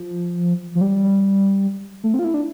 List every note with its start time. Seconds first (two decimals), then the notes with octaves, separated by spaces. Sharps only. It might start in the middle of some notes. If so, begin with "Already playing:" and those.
Already playing: F3
0.75 F3
0.81 G3
2.04 A3
2.14 C4
2.19 F4
2.24 E4
2.34 D4